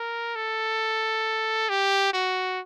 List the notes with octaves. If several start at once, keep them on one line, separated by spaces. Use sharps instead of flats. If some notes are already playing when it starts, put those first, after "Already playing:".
Already playing: A#4
A4
G4
F#4